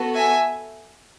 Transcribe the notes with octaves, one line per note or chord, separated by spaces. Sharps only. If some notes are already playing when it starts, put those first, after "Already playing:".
Already playing: B3 F#4 A4
E5 G#5